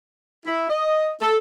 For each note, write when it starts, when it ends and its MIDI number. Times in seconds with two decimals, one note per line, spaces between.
0.46 0.67 64
0.70 1.11 75
1.22 1.37 69